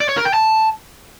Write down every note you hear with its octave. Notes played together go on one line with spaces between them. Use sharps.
D5
C#5
A#4
G5
A5